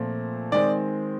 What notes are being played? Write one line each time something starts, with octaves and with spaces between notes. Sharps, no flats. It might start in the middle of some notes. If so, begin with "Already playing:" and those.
Already playing: A#2 F3 A3 C4
D#3 G#3 C4 D5